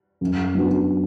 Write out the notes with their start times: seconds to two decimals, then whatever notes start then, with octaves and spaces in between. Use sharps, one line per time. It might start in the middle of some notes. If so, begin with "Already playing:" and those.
0.21 F#2
0.55 F#3 B3 D4 F#4